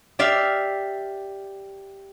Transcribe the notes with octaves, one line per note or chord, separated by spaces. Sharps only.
G4 D5 E5 F5